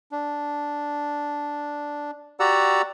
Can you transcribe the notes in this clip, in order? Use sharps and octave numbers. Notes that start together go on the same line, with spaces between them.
D4
F#4 G4 D5 F#5 A#5 E6